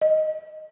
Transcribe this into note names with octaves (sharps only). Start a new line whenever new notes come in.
D#5